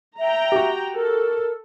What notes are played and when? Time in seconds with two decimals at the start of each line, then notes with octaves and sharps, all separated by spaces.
0.19 E5 G5 A#5
0.52 F#4 G4
0.95 A4 A#4